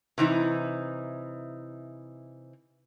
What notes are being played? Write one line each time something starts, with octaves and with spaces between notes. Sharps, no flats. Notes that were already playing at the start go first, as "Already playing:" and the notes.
C3 E3 D#4 E4